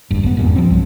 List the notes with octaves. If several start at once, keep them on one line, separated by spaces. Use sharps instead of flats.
F#1 G2
F#1 B3
E2 G2 A#2
F3 C4
C2 G2 F#3